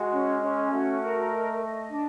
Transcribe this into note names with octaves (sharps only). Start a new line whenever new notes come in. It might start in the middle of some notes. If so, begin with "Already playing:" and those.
Already playing: G#3 F#4
C#4
C#4
A3 F#4
A#4
D#5
D#5
D4